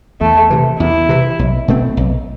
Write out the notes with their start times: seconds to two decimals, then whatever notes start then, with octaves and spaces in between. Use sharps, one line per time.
0.21 E2 A3
0.50 C3 E3
0.80 E2 E4
1.09 C3 E3
1.39 B1
1.68 B2 A3 C4
1.97 B1